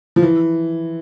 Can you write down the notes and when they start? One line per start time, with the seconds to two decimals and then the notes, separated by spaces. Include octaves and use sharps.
0.16 F3
0.22 E3